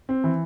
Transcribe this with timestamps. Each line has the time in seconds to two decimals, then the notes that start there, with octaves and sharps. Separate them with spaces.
0.09 C4
0.24 E3